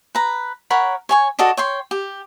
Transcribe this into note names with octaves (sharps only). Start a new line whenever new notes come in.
B4 A#5
A#4 C#5 F#5 B5
C#5 G#5 C#6
F#4 A4 D5 D#5
C#5 G5 C6
G4